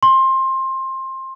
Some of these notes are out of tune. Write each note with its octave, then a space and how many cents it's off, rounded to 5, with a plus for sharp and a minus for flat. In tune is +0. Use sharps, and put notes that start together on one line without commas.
C6 +20